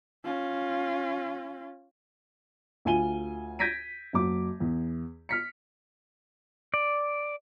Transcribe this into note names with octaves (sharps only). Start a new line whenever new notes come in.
C#4 F4
D2 F4 G#5 D#7 G7
G6 G#6 A#6 B6 D7 D#7
F#1 F#3 D6
E2
F6 B6 C#7
D5